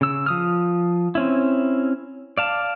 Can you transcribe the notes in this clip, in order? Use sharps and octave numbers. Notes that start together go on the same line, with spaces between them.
C#3 E6
F3 D#6 F6
C4 C#4 E4
D5 F5 A5